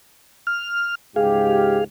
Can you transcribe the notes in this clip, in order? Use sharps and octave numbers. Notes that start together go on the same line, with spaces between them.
F6
C#2 G#2 G4 G#4 F5